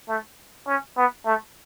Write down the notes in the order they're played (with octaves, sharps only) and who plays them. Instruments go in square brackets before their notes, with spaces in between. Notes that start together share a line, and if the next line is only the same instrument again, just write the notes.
[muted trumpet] A3
C#4
B3
A3